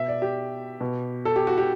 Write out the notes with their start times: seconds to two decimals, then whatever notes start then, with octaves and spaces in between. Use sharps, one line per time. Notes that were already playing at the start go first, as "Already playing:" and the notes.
Already playing: B2 E5
0.08 D5
0.22 G4
0.81 B2
1.25 A4
1.36 G4
1.47 F#4
1.58 G4